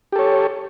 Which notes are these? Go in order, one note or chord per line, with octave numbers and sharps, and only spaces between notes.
G4 A4 C#5